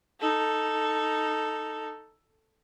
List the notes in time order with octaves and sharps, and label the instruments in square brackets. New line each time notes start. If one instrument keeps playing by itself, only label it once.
[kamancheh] D#4 A4